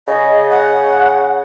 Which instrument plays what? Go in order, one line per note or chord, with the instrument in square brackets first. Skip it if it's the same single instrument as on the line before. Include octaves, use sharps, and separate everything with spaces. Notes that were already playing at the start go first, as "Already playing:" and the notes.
[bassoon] C#3 [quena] D#5
[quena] F#5